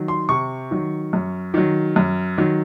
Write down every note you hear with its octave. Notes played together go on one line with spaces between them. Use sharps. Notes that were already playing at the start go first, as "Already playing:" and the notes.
Already playing: D#3 F#3
C6
C3 C#6
D#3 F#3
F#2
D#3 F#3
F#2
D#3 F#3